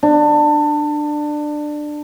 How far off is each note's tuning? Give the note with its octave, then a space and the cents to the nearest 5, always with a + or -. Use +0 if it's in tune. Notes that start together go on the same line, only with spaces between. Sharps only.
D4 +20